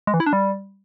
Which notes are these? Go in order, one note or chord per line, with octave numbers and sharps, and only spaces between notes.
G#3
E3
E4
D4
G3